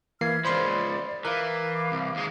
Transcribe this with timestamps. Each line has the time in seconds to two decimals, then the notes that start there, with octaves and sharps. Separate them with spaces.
0.21 E3 A#3 E4 F6 G#6 C7
0.45 C#2 F3 C5 D5 B5 C6
1.25 E3 A#4 F5 D6
1.92 C2
2.15 D#2 G#3